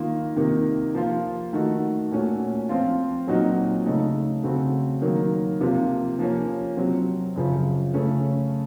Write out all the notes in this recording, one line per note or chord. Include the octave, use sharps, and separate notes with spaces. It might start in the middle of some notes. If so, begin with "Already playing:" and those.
Already playing: D#3 A#3 F4
C3 D#3 A#3
F3 A#3 F4
D#3 A3 D#4 F#4
A#2 A3 C#4 F#4
F3 C4 F4
A#2 F#3 C4 D#4 F#4
C#3 A3 D#4
C#3 A3 C4 F#4
D#3 F#3 A#3
C3 F3 A#3 F4
F3 A#3 C#4
C3 F#3 C4
F#2 C#3 F3
C#3 A3 C#4